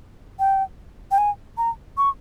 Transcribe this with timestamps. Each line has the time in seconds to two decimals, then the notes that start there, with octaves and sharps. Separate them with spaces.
0.39 G5
1.11 G5
1.18 G#5
1.58 A#5
1.98 C#6